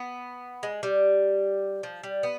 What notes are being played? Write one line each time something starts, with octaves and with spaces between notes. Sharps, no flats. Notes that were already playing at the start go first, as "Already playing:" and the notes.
Already playing: B3
G#3
G3
F3
G3
B3